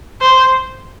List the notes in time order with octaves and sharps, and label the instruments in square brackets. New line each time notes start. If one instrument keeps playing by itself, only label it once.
[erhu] C5